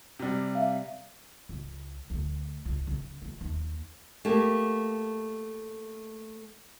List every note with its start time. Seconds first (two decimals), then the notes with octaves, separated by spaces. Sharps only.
0.19 C3 G3
0.55 E5 F5
1.49 C#2
2.10 D2
2.65 C#2
2.87 C#3
3.22 G#3
3.41 D#2
4.25 A3 A#3 G4